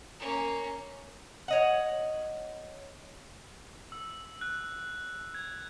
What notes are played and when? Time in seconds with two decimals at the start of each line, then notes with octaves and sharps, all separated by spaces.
0.19 A#3 C#4
1.48 C#5 D#5 F#5
3.92 E6
4.41 F#6
5.35 G#6